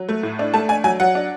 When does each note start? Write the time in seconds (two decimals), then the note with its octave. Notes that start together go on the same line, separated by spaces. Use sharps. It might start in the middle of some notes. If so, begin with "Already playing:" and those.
Already playing: F#3
0.09 A3
0.23 A2
0.39 D4
0.54 A3 A5
0.69 D4 G#5
0.84 F#3 G#5
1.00 F#3 F#5
1.15 D4